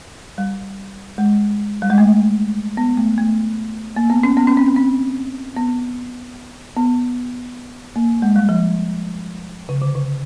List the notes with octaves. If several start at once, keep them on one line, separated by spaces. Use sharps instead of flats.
G3
G#3
G3
G#3
A3
B3
A3
A3
A#3
B3
C#4
B3
C#4
C4
C#4
C4
B3
B3
A#3
G#3
G3
F3
C#3
D3
C#3